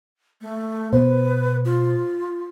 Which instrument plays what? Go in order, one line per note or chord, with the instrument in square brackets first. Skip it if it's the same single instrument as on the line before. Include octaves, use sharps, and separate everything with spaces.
[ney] A3
[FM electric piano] B2 C5 [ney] B4
[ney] F4